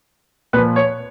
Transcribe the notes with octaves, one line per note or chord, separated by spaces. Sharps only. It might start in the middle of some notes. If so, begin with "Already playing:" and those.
A#2 F3 B4
C#5